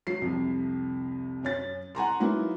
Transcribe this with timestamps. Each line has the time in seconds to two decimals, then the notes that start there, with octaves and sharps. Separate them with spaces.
0.07 F#3 C7
0.22 C2 F2 C3
1.43 F#2 C#4 A6
1.95 F#5 G#5 A#5 C6
2.20 F#3 A#3 B3 D#4 E4